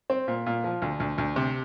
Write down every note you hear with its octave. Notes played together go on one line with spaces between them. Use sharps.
C4
A#2
A#2
F3
D2
D2
D2
C3